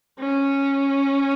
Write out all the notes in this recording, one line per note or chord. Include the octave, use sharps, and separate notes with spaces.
C#4